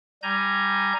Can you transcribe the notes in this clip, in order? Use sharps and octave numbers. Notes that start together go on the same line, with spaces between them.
G3 G#5 A#5 G6